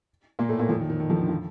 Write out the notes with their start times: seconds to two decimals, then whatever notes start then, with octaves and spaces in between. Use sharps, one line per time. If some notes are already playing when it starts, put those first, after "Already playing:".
0.39 A#2 A#3
0.49 A2 A3
0.59 A#2 A#3
0.69 F2 F3
0.79 D#3
0.90 D#3
1.00 D#3
1.10 F2 F3
1.19 D3
1.29 F3